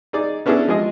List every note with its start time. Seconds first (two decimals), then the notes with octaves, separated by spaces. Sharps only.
0.13 D#4 G#4 D5
0.46 B3 C#4 D4 E4 G#4 A4
0.68 F3 G#3 G4 G#4 D#5